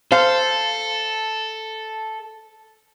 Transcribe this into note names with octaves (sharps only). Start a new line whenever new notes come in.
A4 C5 F5